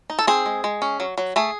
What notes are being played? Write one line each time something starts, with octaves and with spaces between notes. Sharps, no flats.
D#4
A4
C4 G#4
G#3
G#3
C#4
F#3
F#3
A3 G#4